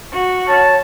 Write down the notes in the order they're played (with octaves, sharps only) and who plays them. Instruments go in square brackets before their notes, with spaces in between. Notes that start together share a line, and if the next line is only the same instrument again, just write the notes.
[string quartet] F#4
[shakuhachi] C#5 [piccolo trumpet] A5